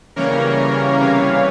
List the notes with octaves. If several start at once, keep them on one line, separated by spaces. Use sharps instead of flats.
C#3 E3 G3 A#3 C#4 A#4 C#5
C3 E3 G3 C#4 E4 C#5 F5